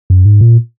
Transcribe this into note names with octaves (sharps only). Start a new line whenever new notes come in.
F#2
G#2
A#2